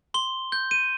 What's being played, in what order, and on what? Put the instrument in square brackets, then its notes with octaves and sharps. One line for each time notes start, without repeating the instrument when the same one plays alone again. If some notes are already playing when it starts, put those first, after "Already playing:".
[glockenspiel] C6 G7
G6
D#7